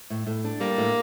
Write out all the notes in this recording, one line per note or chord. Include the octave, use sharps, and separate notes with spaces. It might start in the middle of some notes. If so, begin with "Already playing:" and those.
A2
A2
D4
G3 A#3
A2